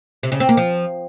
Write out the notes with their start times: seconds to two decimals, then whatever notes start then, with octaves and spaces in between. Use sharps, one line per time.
0.23 C3
0.32 C#3
0.40 C4
0.49 A#3
0.57 F3